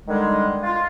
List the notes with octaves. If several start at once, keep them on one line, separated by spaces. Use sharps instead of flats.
D3 D#3 G3 G#3
F4